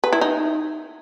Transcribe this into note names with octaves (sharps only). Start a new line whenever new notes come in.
B4
E4
D#4